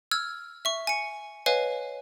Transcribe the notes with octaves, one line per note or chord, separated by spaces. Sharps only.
E6 F6 G#6
E5 C#6
G#5 C#7
B4 C#5 D#5 F5 G#5